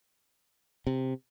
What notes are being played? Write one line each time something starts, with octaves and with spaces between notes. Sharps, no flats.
C3